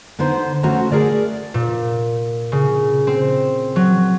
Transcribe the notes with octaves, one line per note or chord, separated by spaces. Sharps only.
D3 B3 D#4 C5
D3 A3 C#4 F#4 C5 A#5
A3 G#4 A#4 D5
A#2
C#3
C4
F#3